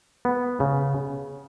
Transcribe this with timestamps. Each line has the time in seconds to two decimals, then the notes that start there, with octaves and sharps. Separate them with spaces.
0.25 B3
0.60 C#3